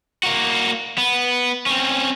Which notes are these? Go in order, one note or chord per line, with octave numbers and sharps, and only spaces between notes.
A#3 F#4
B3
C4 C#4